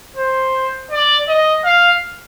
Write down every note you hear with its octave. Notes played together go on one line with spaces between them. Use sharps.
C5
D5
D#5
F5